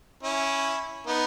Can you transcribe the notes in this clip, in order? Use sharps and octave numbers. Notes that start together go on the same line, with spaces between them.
C#4 E4
B3 D#4